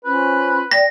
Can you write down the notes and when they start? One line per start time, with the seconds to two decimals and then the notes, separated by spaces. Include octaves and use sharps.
0.04 C#4 F4 B4 C5
0.71 D5 G5 A#6